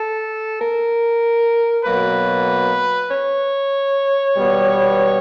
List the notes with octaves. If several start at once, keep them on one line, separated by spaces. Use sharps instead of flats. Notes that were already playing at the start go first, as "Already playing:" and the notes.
Already playing: A4
A#4
B2 F#3 A#3 B4
C#5
B2 G3 B3